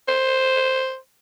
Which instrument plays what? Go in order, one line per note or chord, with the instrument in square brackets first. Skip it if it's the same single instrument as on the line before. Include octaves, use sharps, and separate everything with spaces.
[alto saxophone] C5